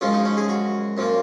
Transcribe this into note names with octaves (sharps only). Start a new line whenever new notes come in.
F#2 C#3 F3 G#3 F4
D#4
C#4
G#4
F#4
F#2 F3 A#3